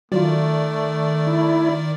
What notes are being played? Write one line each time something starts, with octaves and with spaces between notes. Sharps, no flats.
D#3 F#3 A3 F4 D5
E4